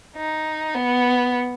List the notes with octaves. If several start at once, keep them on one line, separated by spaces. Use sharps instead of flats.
D#4
B3